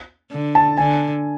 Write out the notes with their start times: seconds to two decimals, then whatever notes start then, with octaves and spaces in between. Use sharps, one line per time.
0.31 D3
0.55 A5
0.77 D3 G#5